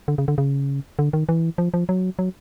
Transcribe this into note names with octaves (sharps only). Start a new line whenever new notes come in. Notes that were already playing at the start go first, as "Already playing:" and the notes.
D3
C#3
D3
C#3
D3
D#3
E3
F3
F3
F#3
F#3